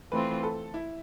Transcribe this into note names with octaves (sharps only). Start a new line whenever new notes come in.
E3 A3 C4 F4 B4
A4
E4